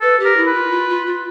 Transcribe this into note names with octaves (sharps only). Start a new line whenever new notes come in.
A4 B4
G4
A#4
E4
B4
F4
F4
F4
F4